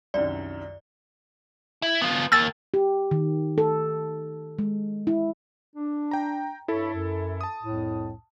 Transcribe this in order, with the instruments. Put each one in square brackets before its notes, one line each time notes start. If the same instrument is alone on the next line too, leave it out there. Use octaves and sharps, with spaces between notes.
[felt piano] C2 F#2 D#3 [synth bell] D5
[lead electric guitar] E4
B3 F4
[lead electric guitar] D#2 A#3 [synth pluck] E6 A6
[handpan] G4
D#3
A4
G#3
E4
[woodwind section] D4
[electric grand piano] G5 A#5
[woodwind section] G2 C#5 B5 [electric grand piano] E4 A4
[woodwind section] F#2
[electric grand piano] A5 D#6
[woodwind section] C2 F2 A2